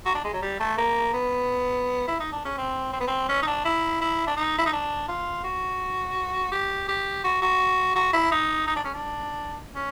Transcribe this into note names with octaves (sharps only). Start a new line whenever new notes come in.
F#4
D4
G#3
F#3
G3
A3
A#3
B3
E4
D#4
D4
C#4
C4
C4
B3
C4
C#4
D#4
D4
E4
E4
D4
D#4
E4
D#4
D4
F4
F#4
G4
G4
F#4
F#4
F#4
E4
D#4
D#4
D4
C#4
D4
C#4